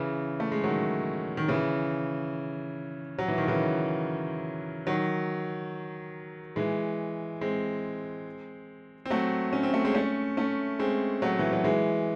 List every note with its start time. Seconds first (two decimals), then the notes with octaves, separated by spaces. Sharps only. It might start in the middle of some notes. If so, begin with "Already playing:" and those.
Already playing: C#3 E3
0.40 A3
0.52 G#3
0.64 D#3 F#3
1.37 D#3
1.48 C#3 E3
3.18 F#3
3.28 E3
3.38 D#3
3.47 C#3 E3
4.87 D#3 F#3
6.56 E3 G#3
7.41 G#3 C4
9.06 C4
9.10 F#3 A3
9.53 C#4
9.63 C4
9.74 A3
9.85 G#3 C4
9.95 A3 C#4
10.37 A3 C#4
10.79 G#3 C4
11.22 F#3 A3
11.39 E3
11.53 F#3
11.64 E3 G#3